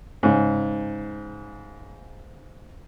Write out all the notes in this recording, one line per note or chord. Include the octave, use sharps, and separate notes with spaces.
G#2 C#3